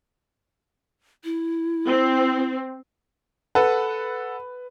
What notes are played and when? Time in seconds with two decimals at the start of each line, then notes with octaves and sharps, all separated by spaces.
1.24 E4
1.86 C4
3.55 A4 B4 F#5